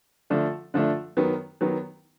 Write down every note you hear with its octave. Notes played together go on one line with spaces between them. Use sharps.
D3 F3 A3 D4
D3 F3 A3 D4
D#3 F#3 B3
D#3 F#3 B3